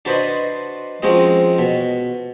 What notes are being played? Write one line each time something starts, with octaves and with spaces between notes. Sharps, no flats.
D4 F#4 B4 C5 D5 D#5
F3 G#3 C4 C#4 F#4 D#5
B2